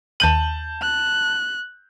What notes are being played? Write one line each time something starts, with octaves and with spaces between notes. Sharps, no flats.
D#2 A5 G6 D#7 F#7
F#6